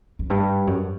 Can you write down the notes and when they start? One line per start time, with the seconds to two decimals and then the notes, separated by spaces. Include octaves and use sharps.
0.19 F#2
0.30 G2
0.67 F#2